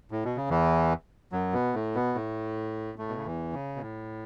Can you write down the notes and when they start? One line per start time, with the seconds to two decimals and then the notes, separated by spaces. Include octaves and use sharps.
0.11 A2
0.24 B2
0.37 C#3
0.50 E2 E3
1.32 F#2 F#3
1.53 B2 B3
1.74 A2 A3
1.95 B2 B3
2.15 A2 A3
2.98 A2 A3
3.09 B2
3.17 C#3
3.25 E2 E3
3.53 C#3
3.76 B2
3.81 A2